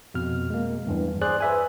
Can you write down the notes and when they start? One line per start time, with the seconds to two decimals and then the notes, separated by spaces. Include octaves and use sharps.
0.14 F2 B2 F6
0.50 G#3 A#3
0.86 E2 G2 E3
1.21 G#4 C5 D5 F#6
1.40 B4 E5 G#5